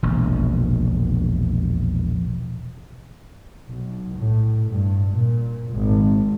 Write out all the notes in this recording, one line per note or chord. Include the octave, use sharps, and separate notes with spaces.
E1 A#1
B1
A2
G2
A#2
G#1